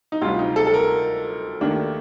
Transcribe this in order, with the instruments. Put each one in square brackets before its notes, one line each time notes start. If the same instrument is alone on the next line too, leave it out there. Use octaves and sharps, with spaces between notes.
[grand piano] D#4
[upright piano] D2 C3 G3 [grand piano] F4
[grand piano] D#4
A4
A4
A#4
[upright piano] D#2 D#3 A3 D4